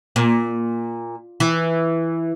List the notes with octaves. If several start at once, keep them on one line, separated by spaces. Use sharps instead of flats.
A#2
E3